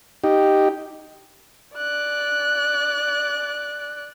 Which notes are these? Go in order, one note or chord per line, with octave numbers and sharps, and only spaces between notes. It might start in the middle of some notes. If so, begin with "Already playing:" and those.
D#4 G4
D5 F#6